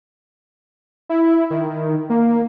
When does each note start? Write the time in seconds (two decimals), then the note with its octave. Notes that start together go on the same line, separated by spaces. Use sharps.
1.09 E4
1.50 D#3
2.10 A#3